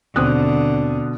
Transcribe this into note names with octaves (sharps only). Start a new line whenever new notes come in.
D#2 B2 D3 C4 D#6 F#6